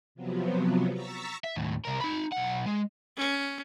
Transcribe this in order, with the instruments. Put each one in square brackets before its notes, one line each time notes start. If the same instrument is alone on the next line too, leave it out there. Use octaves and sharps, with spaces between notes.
[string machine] C3 F3 F#3 B3
A#5 C#6 E6 A6 B6
[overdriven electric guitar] E5
D#2 A2
C2 A#4
D#4 B5
B1 F#5
G#3
[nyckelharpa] C#4